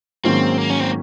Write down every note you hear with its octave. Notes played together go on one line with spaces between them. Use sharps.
G#2 D#3 F#3 A#3 C4 C#4
A#3
C#4
C4